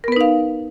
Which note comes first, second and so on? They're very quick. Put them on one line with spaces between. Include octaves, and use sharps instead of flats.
A#4 B3 B4 D#4 F5